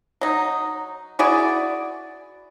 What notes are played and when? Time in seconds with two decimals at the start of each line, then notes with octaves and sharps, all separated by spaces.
0.21 F#3 D#4
1.19 E4 F#4 G#4 D5